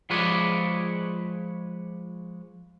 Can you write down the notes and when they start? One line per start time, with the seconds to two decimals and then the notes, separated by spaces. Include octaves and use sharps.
0.10 F3 G#3 B4 C#5 D5